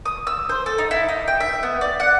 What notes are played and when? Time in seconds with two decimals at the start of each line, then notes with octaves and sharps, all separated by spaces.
0.06 D#6
0.27 E6
0.49 C5
0.66 A4
0.78 D#4
0.91 E4
1.09 D#4
1.28 G5
1.40 E5
1.63 B3
1.81 D5
2.00 F#5